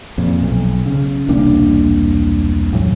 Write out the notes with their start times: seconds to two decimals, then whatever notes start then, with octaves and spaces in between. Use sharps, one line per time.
0.18 F2 A#2
0.43 B1
0.86 C#3
1.28 E1 C2 A#3 D4
2.72 A1 A2 F#3